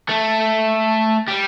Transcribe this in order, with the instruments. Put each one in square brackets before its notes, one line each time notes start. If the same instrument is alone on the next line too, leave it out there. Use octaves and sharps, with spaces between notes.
[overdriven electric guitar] A3
G3